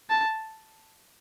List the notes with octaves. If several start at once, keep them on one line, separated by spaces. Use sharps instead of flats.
A5